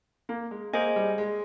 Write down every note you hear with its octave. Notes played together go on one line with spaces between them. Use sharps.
A#3
G#3
A#3 G#4 C5 D#5 G#5
G3
G#3